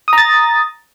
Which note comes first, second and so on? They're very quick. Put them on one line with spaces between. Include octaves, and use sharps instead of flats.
D#6 A#5 A6